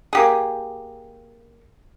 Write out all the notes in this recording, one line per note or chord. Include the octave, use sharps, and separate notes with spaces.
A#3 G4 G#4